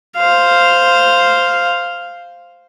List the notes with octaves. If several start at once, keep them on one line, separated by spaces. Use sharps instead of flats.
C5 F5